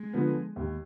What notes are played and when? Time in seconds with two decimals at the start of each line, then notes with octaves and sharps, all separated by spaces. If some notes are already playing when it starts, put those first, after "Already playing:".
Already playing: G#3
0.13 D3 F3 B3
0.56 D#2